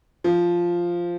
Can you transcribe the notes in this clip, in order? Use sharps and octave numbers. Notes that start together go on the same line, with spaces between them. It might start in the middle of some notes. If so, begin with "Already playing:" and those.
F3